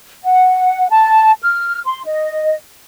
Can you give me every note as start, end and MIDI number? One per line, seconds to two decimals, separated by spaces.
0.24 0.87 78
0.91 1.32 81
1.42 1.79 89
1.86 2.01 84
2.05 2.55 75